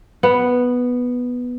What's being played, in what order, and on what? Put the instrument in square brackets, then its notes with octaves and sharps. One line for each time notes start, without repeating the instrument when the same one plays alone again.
[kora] B3